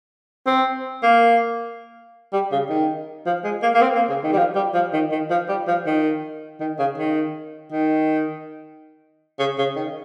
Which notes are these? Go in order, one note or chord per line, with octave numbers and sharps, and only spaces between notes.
C4
A#3
G3
C#3
D#3
F3
G#3
A#3
A#3
C4
A#3
C#3
D#3
G3
F3
G3
F3
D#3
D#3
F3
G3
F3
D#3
D#3
C#3
D#3
D#3
C#3
C#3
D#3